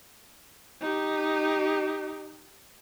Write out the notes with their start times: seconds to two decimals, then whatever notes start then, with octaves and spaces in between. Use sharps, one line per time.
0.81 D#4 G4